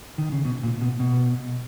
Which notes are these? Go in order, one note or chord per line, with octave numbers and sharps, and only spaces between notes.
D#3
C#3
B2
A#2
B2
B2